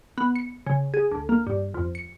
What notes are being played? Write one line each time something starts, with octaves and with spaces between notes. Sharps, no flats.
B3
C#7
C#3
G#4
D2
A#3
G2
F2
C#7